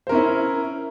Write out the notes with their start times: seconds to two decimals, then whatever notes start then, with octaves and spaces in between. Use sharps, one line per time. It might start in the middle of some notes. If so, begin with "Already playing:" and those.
0.07 C5
0.09 A#4
0.12 C#4
0.15 E4